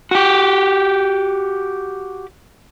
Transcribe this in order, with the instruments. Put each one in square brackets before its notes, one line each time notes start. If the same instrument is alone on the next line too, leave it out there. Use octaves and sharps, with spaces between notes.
[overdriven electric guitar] F#4 G4